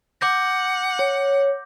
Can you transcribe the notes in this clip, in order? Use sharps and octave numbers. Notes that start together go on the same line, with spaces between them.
F#5 D6 G6 A#6
C#5